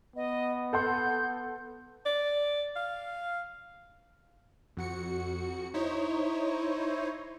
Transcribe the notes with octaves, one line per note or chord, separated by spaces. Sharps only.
B3 D#5
A4 F#5 C6 G6
D5
F5
F2 F#4 C#7
D#4 E4 C5 C#5